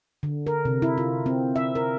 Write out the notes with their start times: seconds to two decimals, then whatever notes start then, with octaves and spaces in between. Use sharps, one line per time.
0.23 D3
0.47 A#4
0.65 C3
0.82 E4
0.98 F4
1.26 C4
1.56 E5
1.75 A#4